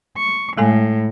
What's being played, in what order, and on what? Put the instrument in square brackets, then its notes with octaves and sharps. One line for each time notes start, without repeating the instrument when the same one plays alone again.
[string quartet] C#6
[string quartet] A2 [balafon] G#3 A4 G#5